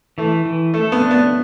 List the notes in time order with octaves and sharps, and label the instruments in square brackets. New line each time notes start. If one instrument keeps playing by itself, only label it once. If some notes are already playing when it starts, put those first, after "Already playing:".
[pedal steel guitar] E3 [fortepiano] A3
[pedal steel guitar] E3
[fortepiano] A3 [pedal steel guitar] A4
[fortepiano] B3
[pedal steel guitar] D4
[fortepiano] B3